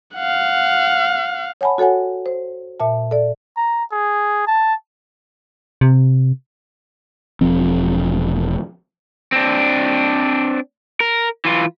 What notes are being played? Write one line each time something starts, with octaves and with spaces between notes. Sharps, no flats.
F5 F#5
C#5 F#5 G#5 A5 B5
F#4 A4 C#5 F#5 G#5
C5
A#2 E5 A5
A4 D5
A#5
G#4
A5
C3
E1 F3 C4
C4 D4
A#4
E3 F4